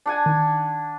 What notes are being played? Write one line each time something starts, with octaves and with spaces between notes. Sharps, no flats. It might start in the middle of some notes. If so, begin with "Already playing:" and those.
D4 F#5 G#5
D#3